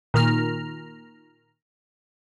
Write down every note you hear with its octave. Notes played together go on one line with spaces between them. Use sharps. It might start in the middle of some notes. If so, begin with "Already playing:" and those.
A#2 D#3 A#5 F6